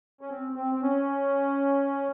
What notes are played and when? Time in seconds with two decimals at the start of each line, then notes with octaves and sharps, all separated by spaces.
0.21 C#4
0.30 C4
0.56 C4
0.75 C4
0.82 C#4